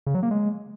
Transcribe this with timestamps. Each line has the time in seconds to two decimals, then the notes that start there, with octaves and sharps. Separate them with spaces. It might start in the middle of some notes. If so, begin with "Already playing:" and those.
0.07 C#3
0.15 F#3
0.23 A#3
0.31 G#3